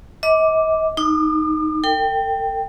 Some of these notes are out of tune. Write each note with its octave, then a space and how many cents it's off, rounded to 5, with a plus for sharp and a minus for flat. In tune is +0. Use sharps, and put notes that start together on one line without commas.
D#5 +40 D6 +0
D#4 +0 D6 +40
A4 +45 G5 +0